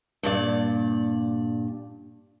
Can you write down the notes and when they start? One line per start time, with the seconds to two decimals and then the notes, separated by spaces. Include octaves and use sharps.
0.23 G2 A#2 D5